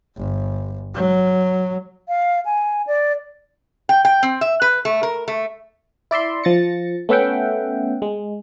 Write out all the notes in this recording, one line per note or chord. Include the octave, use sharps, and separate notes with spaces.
G1
F#3
F5
G#5
D5
G5
G5
C4
E5
B4
A3
A#4
A3
E4 D5 E5 C6
F3 A6 A#6 C#7
A3 B3 C#4 E5 F#5 G5
G#3